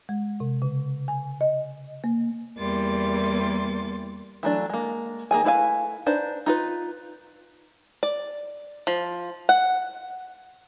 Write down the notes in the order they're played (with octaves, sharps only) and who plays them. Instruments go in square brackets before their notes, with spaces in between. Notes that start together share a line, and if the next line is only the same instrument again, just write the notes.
[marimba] G#3
C3
C#3
G#5
D#5
A#3
[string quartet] E2 G3 A#3 C6 A6
[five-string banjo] E3 F#3 A3 D4
G#3 A#3
D#3 A#3 G#4 G#5
A3 E4 B4 F5 G#5
D4 D#4 B4 C5
D#4 F4 B4
D5
F3
F#5